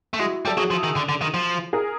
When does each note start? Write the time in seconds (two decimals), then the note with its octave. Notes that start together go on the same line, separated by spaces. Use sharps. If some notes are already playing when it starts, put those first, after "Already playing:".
0.14 A3
0.19 G#3 E4 F#4
0.45 G3 A4
0.57 F#3 F#4 G#4
0.71 F3
0.83 D#3
0.96 D3
1.09 D3
1.22 D#3
1.34 F3
1.73 G#4 A#4